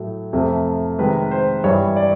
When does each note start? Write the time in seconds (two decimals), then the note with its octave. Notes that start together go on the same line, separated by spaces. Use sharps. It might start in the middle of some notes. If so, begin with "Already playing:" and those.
Already playing: A2 F#3 A3
0.33 F2 C3 F3 A3
0.98 C3 D#3 G#3 B4
1.31 C5
1.64 G2 E3 G3 C#5
1.97 D5